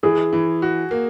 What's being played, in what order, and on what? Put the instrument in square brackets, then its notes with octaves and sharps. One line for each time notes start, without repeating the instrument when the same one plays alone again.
[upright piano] E3 [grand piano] G#4
[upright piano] E3
F#4
A#3